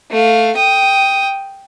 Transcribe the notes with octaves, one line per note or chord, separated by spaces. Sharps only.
A3 F5
G5 D#6